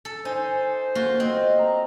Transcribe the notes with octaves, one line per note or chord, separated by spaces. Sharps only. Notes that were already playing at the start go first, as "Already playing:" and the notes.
A4
D#4 C5 G#5
A#3 F4 F#4 C6
C4 D#5
A#5